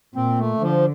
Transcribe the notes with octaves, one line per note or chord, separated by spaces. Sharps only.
A#2 C4
A3
D3 F3